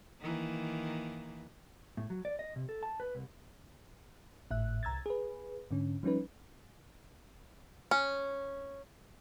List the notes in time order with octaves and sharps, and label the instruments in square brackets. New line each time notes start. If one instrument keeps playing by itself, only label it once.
[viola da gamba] D#3 E3 A#3
[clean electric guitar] A2
F#3
D5
D#5
C3
A4
A5
B4
C2
[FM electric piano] G#1 A2 E5 F#6
C2 A#5 E6 G#6 A6
G#4 B4
G#2 D3 C#4
F3 G3 C#4 D#4 B4
[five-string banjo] C#4